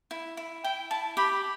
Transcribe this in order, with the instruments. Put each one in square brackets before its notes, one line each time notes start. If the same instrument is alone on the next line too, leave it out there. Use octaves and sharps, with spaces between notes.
[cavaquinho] E4
E4
[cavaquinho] E4 [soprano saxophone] G5
[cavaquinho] E4 [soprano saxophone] A5
[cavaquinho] G4 [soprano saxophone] B5